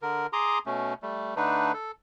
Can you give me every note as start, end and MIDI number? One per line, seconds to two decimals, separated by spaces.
0.02 0.27 50
0.02 0.27 70
0.33 0.59 68
0.33 0.59 82
0.33 0.59 84
0.33 0.59 86
0.33 0.59 87
0.66 0.94 47
0.66 0.94 57
0.66 0.94 61
1.03 1.34 55
1.03 1.34 57
1.36 1.72 50
1.36 1.72 57
1.36 1.72 62
1.36 1.72 63
1.36 1.72 71
1.74 1.91 69